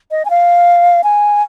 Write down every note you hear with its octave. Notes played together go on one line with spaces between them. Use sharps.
D#5
G#5
F5
G#5